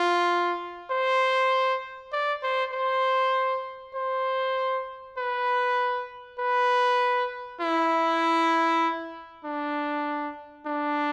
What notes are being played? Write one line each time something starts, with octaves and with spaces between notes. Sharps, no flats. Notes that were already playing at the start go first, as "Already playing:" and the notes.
Already playing: F4
C5
D5
C5
C5
C5
B4
B4
E4
D4
D4